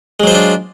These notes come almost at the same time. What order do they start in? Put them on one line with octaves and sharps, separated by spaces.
G#3 F#3 C5 F4 D4